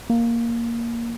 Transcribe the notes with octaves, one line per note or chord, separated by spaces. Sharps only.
A#3